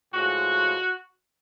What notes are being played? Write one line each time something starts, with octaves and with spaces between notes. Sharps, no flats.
A2 F3 G#3 F#4